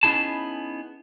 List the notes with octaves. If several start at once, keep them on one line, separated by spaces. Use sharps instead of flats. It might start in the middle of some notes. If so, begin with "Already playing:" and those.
B3 C#4 D#4 E4 G#4 A5